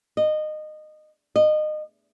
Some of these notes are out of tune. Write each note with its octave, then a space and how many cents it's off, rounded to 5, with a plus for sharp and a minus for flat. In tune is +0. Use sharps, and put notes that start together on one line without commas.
D#5 -20
D#5 -25